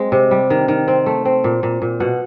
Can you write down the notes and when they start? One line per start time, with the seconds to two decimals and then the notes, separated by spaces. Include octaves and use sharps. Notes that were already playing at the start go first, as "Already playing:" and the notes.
Already playing: G#3 C4
0.12 C3
0.31 G3
0.50 D#3
0.68 D#3
0.88 C4
1.06 A3
1.25 C4
1.44 A#2
1.63 A#2
1.82 A#2
2.00 B2 F#5